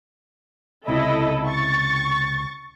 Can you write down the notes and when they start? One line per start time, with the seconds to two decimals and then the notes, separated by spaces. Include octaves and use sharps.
0.88 C#2 C3 E4 A4 D#5
1.48 C#6 A6